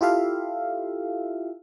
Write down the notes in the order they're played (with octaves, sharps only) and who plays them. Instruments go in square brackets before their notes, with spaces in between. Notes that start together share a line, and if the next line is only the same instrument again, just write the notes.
[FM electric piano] E4 F4 G4 A4 E5 F5